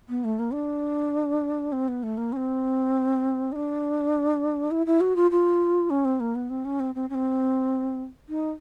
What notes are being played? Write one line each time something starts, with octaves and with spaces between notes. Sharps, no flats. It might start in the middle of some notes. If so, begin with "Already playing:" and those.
B3
A3
A#3
D4
C4
B3
A3
A#3
C#4
C4
D#4
D4
E4
E4
F#4
F4
F4
C#4
C4
A#3
B3
C4
C#4
C4
C4
C#4
C4
D#4